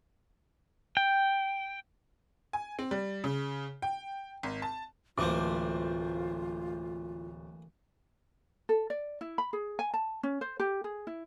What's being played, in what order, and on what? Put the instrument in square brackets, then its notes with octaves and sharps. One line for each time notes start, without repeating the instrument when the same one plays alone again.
[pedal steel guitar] G5
[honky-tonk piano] G#5
C4
G3
C#3
G5
G#1
A5
[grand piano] D1 [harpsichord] E3 A3 A#3 [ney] F4 [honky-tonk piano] C5 D6
[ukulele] A4
D5
E4
B5
G#4
G#5
A5
C#4
C5
G4
G#4
E4